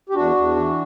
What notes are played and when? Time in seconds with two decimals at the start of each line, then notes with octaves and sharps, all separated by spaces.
0.09 G4
0.14 E2 D4 F#4
0.36 E2
0.56 E3